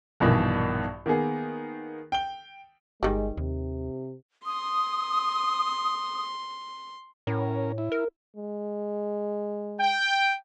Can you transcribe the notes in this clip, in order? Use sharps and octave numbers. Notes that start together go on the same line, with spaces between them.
A#1 G2 B2 D#3 E3
D#3 A#3 B3 G#4
G5 G7
G1 D#3 G3 G#3
D#2 C3
C6 D#6
A2 C#4 A#4
E4
A#4
G#3
G5